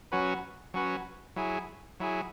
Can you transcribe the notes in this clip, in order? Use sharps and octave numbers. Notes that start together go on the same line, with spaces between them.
F#3 C#4 F#4 B4
F#3 C#4 F#4 B4
F#3 E4 G#4
F#3 E4 G#4